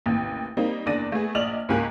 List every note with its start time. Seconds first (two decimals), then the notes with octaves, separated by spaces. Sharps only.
0.06 A1 D#2 C3
0.57 G3 A#3 C4 D#4
0.86 F#1 E2 D4 D5 A#6 D#7
1.12 A3 B3 G#4
1.35 A#1 D5 D#5 F6 F7 F#7
1.69 C#2 G#2 A#3 G4 G#5 F#6